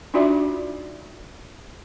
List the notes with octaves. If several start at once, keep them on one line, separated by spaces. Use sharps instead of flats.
D4 D#4 F4 F#4 D5 E5